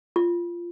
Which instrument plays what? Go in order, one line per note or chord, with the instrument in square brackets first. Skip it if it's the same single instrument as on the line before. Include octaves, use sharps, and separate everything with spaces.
[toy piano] F4